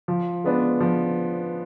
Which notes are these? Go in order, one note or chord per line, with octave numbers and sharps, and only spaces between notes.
F3
G#3 B3 D4
F3